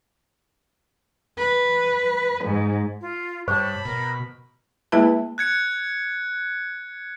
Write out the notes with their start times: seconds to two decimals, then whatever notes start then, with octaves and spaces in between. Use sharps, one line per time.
1.38 B4
2.44 G#2
3.02 F4
3.48 G2 G4 C5 C#5 A5 B5 C#6
3.85 B2 A#4
4.92 G#3 A#3 E4 B4 E5 A5
5.38 F#6 G#6 C#7